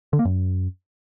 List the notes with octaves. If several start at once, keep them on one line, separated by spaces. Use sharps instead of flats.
D3
A#3
F#2